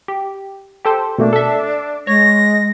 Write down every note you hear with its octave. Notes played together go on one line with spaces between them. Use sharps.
G4
G4 A4 C5
B2 A3 A#3 D4
A4 E5
G#3 C#5 A#6